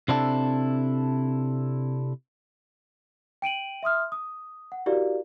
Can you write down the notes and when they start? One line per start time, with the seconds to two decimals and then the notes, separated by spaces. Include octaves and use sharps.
0.08 C3 C4 D4 E4 F#4 A4
3.42 G5 D7 D#7 F#7
3.83 E5 C6 D#6 F6
4.12 D#6
4.72 F#5
4.86 E4 F#4 G4 A#4 D5 F5